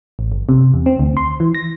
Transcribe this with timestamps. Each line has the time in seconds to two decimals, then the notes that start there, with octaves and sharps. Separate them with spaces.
0.19 A1
0.32 G1
0.49 C3
0.74 E2
0.86 C4
0.99 D2
1.17 C6
1.40 E3
1.55 A#6